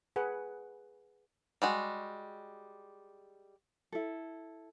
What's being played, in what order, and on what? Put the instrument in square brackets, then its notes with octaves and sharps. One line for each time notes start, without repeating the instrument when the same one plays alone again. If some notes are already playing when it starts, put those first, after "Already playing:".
[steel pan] G#4 B4 F#5
[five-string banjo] G3 G#3 F#4
[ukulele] E4 A4